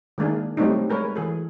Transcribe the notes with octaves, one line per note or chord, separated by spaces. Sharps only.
D#3 G#3 A#3 D4 G#4
F#3 G3 A3 C4 D4 D#4
G#3 A#4 B4 C#5
E3 G#4 A4